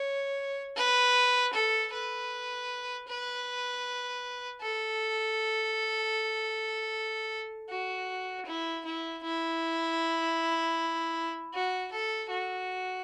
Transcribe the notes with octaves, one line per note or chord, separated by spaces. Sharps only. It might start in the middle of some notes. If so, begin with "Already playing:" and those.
Already playing: C#5
B4
A4
B4
B4
A4
F#4
E4
E4
E4
F#4
A4
F#4